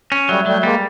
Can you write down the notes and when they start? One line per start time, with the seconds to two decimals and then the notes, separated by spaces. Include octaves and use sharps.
0.12 C#4
0.29 F#3 G3 A3
0.46 F#3 G3 A3
0.63 G3 G#3 A#3